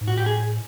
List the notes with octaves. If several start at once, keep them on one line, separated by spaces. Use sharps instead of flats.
G#2
A2 F#4
G4
G#4